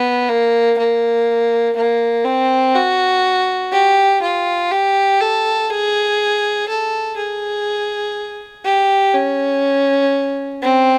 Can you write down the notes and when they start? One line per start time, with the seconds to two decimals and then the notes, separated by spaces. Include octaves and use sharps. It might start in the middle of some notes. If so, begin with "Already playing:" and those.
Already playing: B3
0.29 A#3
0.78 A#3
1.76 A#3
2.25 C4
2.75 F#4
3.72 G4
4.22 F4
4.72 G4
5.21 A4
5.70 G#4
6.68 A4
7.17 G#4
8.65 G4
9.14 C#4
10.62 C4